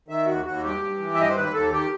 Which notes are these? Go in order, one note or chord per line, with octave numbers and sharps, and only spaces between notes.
D#3 E5
D#2 F#4
D#2 F#4
G2 G4
G2
E3
E5
G2 D#5
C5
D#2 B4
D#2 A4
D#3 G4